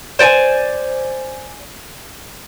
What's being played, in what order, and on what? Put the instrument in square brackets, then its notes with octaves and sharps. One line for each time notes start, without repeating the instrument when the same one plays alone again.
[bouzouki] C5 D5 G5 G#5